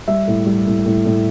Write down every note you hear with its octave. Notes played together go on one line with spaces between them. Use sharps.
G3 E5
A2
G3
A2
A2
A2